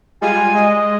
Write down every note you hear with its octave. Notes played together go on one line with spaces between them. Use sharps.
G3 G#3 F4 G#5
G#3 D#5